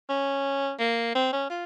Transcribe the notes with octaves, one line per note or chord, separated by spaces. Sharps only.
C#4
A#3
C4
C#4
F4